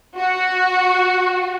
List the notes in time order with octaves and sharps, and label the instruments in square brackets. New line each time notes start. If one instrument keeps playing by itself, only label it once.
[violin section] F#4